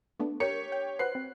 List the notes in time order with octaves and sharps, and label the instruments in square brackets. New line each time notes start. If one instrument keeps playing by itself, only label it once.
[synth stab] A3 B3 D4
[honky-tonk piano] G4 C#5 C#7 [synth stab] A#4
[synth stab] G5
[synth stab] F#4 B4 C5 [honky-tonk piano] F#6 C7
[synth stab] C4